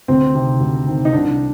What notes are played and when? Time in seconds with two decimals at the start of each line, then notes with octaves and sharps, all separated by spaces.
0.08 D2 C4
0.34 C3 D#3
0.60 D2
0.87 C3 D#3
1.05 D#4
1.13 C2 D4